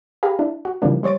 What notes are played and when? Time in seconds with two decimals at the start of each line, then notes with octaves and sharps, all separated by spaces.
0.23 G4 G#4 F5 A#5 B5
0.39 D4 E4
0.65 F#4
0.82 C#3 E3 F3 G3 A#3 D4
1.03 G3 C5 C#5 A6 D7